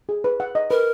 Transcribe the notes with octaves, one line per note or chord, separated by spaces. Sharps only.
G#4
B4
F#5
D#5
A#4 B4